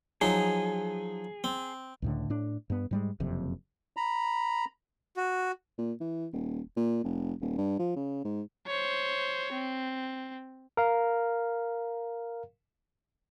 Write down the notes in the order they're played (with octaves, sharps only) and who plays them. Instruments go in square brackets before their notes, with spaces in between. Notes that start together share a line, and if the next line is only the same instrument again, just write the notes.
[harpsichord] F3 F#3 D#4 [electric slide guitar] G#4
[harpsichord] C4
[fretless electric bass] C#2 A2 D3
A2 D4
G2 B3
G#2 G3 G#3
F#1 F2 C3
[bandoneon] A#5 B5
[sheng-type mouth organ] F#4
[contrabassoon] A#2
E3
D#1
A#2
F1
D#1
G2
F3
C#3
G#2
[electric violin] C5 C#5
C4
[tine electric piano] A#4 F5